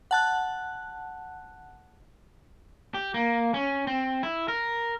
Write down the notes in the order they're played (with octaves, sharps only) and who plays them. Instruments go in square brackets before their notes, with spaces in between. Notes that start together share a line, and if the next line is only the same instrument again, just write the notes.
[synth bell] F#5 A5 F#6
[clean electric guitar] G4
A#3
C#4
C4
E4
A#4